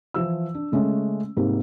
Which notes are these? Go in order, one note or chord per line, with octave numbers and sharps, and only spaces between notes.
E3 F3 E6
D4
C#3 G#3 A3 C#4
G#2 C3 G3 A#3